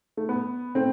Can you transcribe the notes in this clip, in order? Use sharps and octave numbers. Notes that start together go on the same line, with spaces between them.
A3
B3
A3 C4